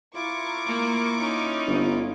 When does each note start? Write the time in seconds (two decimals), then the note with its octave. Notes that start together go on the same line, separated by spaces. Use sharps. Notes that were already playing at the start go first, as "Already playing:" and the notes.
0.15 E4 F4 A#5 C#6 D6
0.66 A#3
1.18 C#4 D#4
1.67 G1